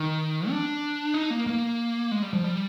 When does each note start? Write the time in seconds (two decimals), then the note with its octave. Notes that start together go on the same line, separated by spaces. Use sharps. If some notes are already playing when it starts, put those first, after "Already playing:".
Already playing: D#3
0.49 D4
1.14 D#4
1.31 A#3
1.47 A#3
2.11 G#3
2.22 G3
2.33 F3
2.44 G3